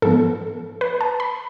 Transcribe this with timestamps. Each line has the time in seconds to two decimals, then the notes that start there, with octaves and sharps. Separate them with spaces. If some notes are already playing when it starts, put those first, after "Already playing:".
0.02 G#2 F3 B3 A4
0.81 B4
1.01 A5
1.20 B5